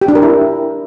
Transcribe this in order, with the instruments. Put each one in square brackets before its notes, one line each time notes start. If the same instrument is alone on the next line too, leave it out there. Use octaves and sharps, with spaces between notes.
[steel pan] G4
D4
A#4
E4